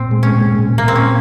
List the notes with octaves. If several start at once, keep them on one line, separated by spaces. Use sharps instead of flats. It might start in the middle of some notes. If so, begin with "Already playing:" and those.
Already playing: A#2 C4
G#3
C#4
A#2
A#2
A#3
A#2 C4
C#4